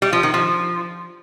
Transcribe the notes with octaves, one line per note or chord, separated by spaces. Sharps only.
G3
F3
D#3
F3